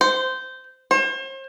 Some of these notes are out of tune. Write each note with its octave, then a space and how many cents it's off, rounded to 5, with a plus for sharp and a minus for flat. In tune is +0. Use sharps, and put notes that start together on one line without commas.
C5 -15
C5 +40